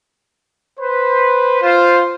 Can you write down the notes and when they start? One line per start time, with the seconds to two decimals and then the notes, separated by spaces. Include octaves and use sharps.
0.80 B4 C5
1.62 F4 C5